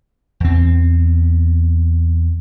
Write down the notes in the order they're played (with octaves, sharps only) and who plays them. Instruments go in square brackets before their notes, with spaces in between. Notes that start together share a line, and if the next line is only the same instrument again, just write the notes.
[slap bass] E2 C4